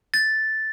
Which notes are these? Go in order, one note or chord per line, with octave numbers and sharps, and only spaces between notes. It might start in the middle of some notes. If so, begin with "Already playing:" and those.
A6